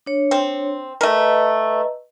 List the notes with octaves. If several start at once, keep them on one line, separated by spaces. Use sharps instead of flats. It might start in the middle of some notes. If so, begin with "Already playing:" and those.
D4 C#5
C4
A3 A#4 B4 D#5 A#5